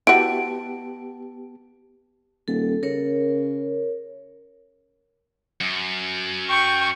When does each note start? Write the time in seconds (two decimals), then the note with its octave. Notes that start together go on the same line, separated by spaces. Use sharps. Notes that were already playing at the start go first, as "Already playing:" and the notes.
0.07 B3 E4 F#4 G4 A5 D7
2.48 D#1 A4
2.83 C#3 A#4 C#5
5.61 F#2
6.50 G5 C#6